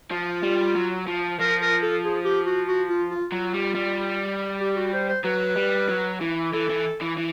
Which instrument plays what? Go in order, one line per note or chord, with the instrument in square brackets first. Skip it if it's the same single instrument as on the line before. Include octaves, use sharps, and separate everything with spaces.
[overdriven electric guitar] F3 [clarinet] F4
[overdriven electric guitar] G3
F#3
F3
[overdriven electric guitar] F3 [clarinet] A#4
[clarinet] A#4
A4
G#4
G4
F#4
F#4
F4
F4
[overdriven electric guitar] F#3 [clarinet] F4
[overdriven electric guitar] G3
G3
[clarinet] G4
F#4
C5
C5
[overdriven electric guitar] F#3 [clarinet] B4
[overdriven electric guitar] G3
F#3
E3
[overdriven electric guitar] E3 [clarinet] A4
[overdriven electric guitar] E3
E3
E3